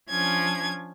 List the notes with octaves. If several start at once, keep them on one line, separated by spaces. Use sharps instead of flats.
F3 C#4 D4 G#6